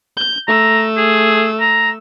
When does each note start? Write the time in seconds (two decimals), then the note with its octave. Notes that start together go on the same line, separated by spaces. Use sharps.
0.17 G6
0.48 A3 A#5 E6
0.97 G#4
1.60 A#5